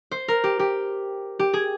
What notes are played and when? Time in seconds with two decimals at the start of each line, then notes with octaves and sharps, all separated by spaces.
0.11 C5
0.28 A#4
0.44 G4
0.59 G4
1.39 G4
1.54 G#4